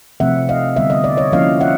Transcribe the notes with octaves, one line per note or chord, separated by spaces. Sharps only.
C3 F3 A3 C4 E5 F#5
D#5 F5
D3 G3 B3 E5
D#5
D5
C#5 D#5
F3 A#3 C#4 E4 D#5 F5
E5 F#5